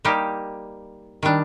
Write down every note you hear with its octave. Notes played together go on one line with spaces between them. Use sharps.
G3 A#3 D#4 G4
D#3 G3 D4